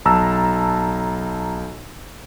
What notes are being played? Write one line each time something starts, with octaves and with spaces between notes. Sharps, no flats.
B1 A5 A#5 E6